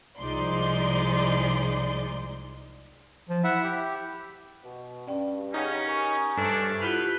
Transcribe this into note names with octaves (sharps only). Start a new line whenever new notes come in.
C2 F3 G#3 D#4 D5 C6
F3
E4 E5 F#5
G4
B2
G2 C#4 D5 G5
C#3 C#4 D#4 G4 F#5 G5
A#4 G#5 C#6
G2 C3 A3 C#4 D4 A4
B3 E4 F4 G4 B4 F6 G6